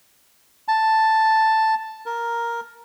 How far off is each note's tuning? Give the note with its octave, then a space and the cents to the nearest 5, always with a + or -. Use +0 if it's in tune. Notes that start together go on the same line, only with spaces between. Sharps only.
A5 +5
A#4 +5